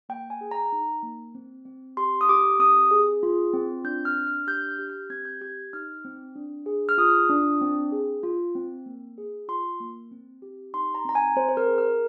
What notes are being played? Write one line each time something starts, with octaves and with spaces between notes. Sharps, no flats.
A#3 G5
G#5
G#4
A#5
D#4
A#3
C4
C4
G4 C6
D#6
G4 D6
C4 D#6
G#4
F4
C4
D4 G6
F6
D4
F6
G4 G6
F6
G4
G6
C4 G#6
G6
G4 G#6
D#4 F6
C4
D4
G#4
F6
F4 D#6
D4
C4
G#4
F4
C4
A#3
G#4
F4 C6
A#3
C4
G4
D#4 C6
A#5
C4 A#5
G#5
C4 C5
C5
A#4
G#4
A#4